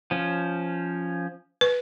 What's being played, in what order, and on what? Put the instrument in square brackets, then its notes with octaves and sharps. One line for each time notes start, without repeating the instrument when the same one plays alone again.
[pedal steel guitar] F3 C#4
[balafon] B4